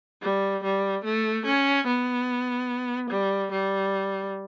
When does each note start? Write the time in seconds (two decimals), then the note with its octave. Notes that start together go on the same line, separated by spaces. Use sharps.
0.22 G3
0.63 G3
1.04 A3
1.46 C#4
1.87 B3
3.10 G3
3.51 G3